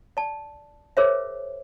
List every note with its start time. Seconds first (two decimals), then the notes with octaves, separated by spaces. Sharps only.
0.17 D5 A5
0.97 G#4 A#4 C5 C#5 E5